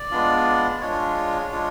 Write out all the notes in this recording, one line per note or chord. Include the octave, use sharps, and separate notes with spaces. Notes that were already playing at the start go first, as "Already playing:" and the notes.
Already playing: D5
G#3 B3 D4 F4
G#3 D4 F4 C#5
G#3 D4 F4